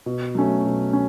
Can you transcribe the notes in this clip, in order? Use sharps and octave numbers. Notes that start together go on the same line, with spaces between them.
B2
F#3 A3 C#4
B2
C#4